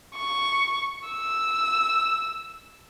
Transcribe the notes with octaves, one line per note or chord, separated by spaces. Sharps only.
C#6
E6